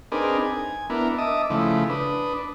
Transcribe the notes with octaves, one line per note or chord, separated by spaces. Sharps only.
C4 D4 D#4 G#4 A#4 B4
G#5
B3 D4 E4 A#4
D#5 E5 A5 D6 D#6
C#3 F3 A3 E4
D4 B4 D#6